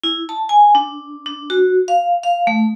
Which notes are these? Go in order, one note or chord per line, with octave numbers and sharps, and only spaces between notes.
E4
A5
G#5
D4
D4
F#4
F5
F5
A3